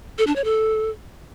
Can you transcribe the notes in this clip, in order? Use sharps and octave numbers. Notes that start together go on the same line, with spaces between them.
A4
D4
C#5
A4